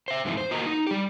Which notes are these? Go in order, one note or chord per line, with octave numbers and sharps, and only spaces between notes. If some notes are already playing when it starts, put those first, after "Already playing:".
C5 E5
F2 G#2 E3 C4 D#4
C5
A#3 F4 F#4 A#4 D#5 A#5
D#4
G3 G4